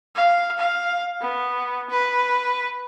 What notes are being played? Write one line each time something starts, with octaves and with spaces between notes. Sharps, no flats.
F5
F5
B3
B4